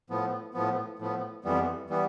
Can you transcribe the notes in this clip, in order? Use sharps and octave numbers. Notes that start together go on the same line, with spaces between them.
A2 F3 B3
A2 F3 B3
A2 F3 B3
F2 E3 G3 B3
E3 G3 B3